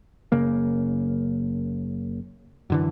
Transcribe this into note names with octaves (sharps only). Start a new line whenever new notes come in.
F#1 C#3 A#3
F#2 D3 E3